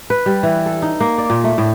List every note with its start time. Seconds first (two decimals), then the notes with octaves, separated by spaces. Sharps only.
0.10 B4
0.26 G3
0.43 E3
0.66 A4
0.82 D#4
1.00 A#3
1.18 D5
1.30 A#2
1.44 A3
1.58 A2